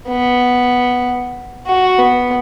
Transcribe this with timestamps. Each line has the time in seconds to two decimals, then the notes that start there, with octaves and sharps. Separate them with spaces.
0.09 B3
1.67 F#4
1.99 B3